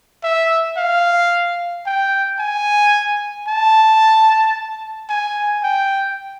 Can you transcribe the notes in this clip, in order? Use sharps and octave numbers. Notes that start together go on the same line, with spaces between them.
E5
F5
G5
G#5
A5
G#5
G5